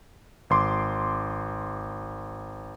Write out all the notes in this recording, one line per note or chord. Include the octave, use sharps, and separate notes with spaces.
G#1 C6 D6